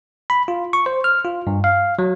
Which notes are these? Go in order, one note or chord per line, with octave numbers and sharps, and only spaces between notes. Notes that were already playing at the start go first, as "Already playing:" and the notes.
B5
F4
C#6
C5
F6
F4
G2
F5
F#3